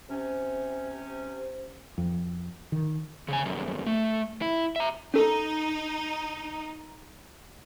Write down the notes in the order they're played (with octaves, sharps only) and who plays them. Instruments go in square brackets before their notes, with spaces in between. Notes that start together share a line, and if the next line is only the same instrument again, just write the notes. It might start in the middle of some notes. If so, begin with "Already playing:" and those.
[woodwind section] C3 C#4
[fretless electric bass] F2
D#3
[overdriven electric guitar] C#3 G#5
C2 F#2
A3
E4
E5 A#5
[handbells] C#4 A4 [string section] D#4